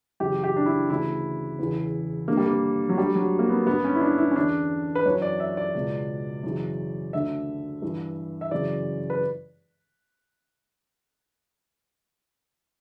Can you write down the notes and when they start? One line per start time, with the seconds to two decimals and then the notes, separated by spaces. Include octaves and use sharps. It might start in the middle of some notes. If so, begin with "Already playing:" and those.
0.20 F#2 C#3 E3 G4
0.44 G4
0.56 D4
0.66 E4
0.90 D2 C#3 E3 E4
1.59 E2 C#3 E3
2.28 G2 D3 A#3
2.37 G3
2.46 A#3
2.89 F#3
2.97 D2 D3 G3
3.15 F#3
3.39 A#3
3.50 B3
3.66 G2 D3 B3
3.84 C#4
3.95 E4
4.01 D4
4.18 E4
4.31 C#4
4.36 E2 D3 D4
4.95 B4
5.05 F#2 E3 C#5
5.22 D5
5.40 E5
5.57 D5
5.74 C#2 B2
6.43 F#2 C#3 E3
7.13 D2 D3 E5
7.82 G2 E3
8.41 E5
8.51 F#2 C#3 E3 D5
9.10 B4